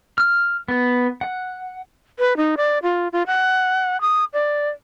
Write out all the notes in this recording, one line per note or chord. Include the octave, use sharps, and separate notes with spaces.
F6
B3
F#5
B4
D#4
D5
F4
F4
F#5
D#6
D5